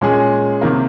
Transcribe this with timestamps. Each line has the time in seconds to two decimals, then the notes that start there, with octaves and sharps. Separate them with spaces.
0.01 A#2 G#3 C#4 G#4
0.61 C3 D#3 A#3